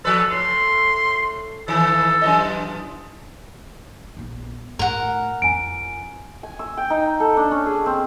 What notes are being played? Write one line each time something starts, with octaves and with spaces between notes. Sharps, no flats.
F3 A4 B4
A2 C6
D#3 E3 A4
F#2 E3 D#5
A#1 B3
A2 A#4 F#5
F2 C#4 G#5 D7
G#5
E6
G5
D#4
A4
D4
C#4
G#4
C4